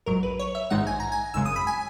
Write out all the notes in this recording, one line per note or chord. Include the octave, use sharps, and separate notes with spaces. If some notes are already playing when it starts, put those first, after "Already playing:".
A#1 G#2 F#3 A#4
B4
C#5
E5
A#1 G#2 D#3 G#3 D#4 F#5
G#5
A#5
G#5
G#1 F#2 C#3 G#3 E6
D#6
B5
G#5